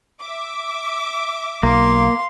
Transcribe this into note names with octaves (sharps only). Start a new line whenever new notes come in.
E5 D6
B1 A#3 F5 C6